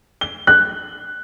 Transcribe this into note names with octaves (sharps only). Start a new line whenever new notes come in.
G7
F#6